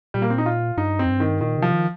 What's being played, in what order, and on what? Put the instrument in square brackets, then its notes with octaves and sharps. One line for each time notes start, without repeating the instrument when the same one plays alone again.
[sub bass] A#2 [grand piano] G3
[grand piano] A#3
C4
D#4
F4
[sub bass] G2 [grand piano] D#4
[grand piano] C4
[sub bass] F2
G2
[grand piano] D#3
[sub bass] A#2 [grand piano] D#3
[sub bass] C3
[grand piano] F3
[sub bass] D#3